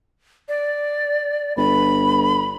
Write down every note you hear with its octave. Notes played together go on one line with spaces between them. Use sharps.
D5
G1 B5